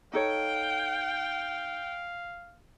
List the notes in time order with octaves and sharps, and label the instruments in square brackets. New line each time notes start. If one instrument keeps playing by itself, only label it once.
[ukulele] D#4 A4 C#5 [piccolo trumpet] F5 [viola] G5